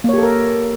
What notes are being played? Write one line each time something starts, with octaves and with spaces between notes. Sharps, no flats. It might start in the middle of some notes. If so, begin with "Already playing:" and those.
A#3 G4 A4 A#4 C#5